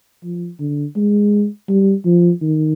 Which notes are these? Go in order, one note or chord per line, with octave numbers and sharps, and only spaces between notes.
F3
D3
G#3
G3
F3
D#3